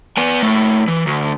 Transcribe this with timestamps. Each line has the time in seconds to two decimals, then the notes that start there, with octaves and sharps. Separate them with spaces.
0.17 B3 G#5
0.43 A#2 A3
0.88 E3
1.07 D2